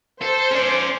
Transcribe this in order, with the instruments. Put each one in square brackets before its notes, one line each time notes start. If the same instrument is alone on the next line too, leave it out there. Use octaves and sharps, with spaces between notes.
[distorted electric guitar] A4 [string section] C5
[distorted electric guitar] C#4 D5